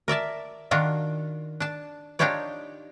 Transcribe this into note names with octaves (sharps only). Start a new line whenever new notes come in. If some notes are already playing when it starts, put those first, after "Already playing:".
A#4 D5 E5 A5
D#3 D4 F4 F#4
D4 A5
D4 D#4 F4 G4 C#5 D5